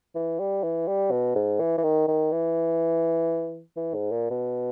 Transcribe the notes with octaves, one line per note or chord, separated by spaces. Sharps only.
E3
G3
E3
G3
B2
G#2
E3
E3
D#3
D#3
E3
E3
G#2
A#2
B2